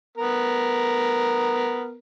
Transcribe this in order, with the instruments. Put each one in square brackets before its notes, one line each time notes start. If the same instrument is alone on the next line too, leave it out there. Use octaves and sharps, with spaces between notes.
[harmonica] B3 A#4